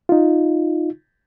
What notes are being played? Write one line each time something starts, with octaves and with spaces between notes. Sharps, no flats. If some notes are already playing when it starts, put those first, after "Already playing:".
D#4 F4